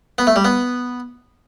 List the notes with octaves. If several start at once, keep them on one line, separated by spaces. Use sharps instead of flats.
B3
A3
G3
B3